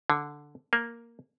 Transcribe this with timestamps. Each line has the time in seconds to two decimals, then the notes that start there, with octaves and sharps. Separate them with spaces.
0.10 D3
0.73 A#3